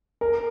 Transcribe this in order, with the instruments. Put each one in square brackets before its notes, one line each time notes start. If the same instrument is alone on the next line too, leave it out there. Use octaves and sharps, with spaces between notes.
[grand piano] A#4